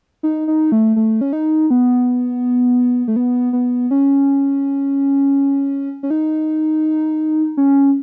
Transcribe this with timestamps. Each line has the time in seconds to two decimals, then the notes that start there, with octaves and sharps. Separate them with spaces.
0.23 D#4
0.48 D#4
0.72 A3
0.96 A3
1.21 C#4
1.33 D#4
1.70 B3
3.08 A3
3.16 B3
3.53 B3
3.91 C#4
6.03 C#4
6.10 D#4
7.57 C#4